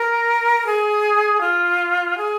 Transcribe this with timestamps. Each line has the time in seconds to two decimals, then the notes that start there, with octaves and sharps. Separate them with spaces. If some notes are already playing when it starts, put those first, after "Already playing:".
Already playing: A#4
0.66 G#4
1.41 F4
2.17 G#4